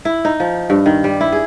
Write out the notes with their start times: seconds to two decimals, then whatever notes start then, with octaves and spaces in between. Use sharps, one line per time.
0.05 E4
0.25 D#4
0.40 F3
0.70 G2
0.86 D#3
1.04 G3
1.21 E4
1.32 G#4